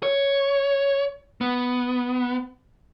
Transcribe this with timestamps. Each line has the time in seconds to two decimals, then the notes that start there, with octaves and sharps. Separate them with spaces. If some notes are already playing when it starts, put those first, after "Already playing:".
0.03 C#5
1.41 B3